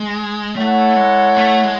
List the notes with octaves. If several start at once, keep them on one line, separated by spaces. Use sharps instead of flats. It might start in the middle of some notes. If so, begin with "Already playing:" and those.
Already playing: G#3
A3 E4 A4 C#5 F#5
G#3
A3
G#3